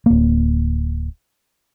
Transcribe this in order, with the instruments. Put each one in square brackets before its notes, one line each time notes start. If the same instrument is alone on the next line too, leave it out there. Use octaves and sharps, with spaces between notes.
[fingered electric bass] D1 A#3